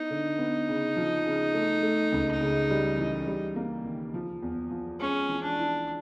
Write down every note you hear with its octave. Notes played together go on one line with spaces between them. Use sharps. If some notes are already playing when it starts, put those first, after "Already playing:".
Already playing: B3 D#4 E4
D3
B3
C#3
F3
C#3
A3
A3
C#2
C#3
G3
E3
G3
A#3
D#3
F3
E2
F3
G#3 C#4
E3
D4
E4